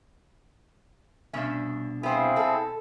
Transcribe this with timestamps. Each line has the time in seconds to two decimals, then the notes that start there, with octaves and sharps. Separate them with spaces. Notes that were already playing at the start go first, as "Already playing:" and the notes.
1.33 C2 G2 B2 C#4 D4 E5
2.03 B3 C4 E4 G#4 C5 F5
2.36 B2 A4